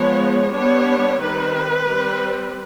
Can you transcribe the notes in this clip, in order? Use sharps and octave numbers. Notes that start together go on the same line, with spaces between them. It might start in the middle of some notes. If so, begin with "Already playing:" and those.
Already playing: F3 G#3 B3 C#5
G3 B3 D4 C#5
D#3 G3 C4 B4
G3 C4